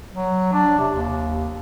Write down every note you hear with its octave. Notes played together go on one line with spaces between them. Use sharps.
F#3
D4
C3
D#2